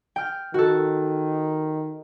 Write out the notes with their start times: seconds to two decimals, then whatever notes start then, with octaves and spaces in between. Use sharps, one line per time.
0.16 G5 F6
0.54 D#3 F#4 A4